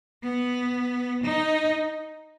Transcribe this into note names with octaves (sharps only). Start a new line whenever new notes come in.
B3
D#4